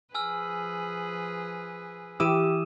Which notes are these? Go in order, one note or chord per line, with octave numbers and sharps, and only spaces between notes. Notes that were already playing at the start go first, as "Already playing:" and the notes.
F3 G#4 B4 G#5 E6 F6
E3 E4 G4 D#6 E6 D#7 E7